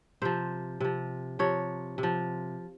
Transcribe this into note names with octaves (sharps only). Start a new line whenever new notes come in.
C3 F3 C5
C3 F3
C3 F3 C#5
C3
F3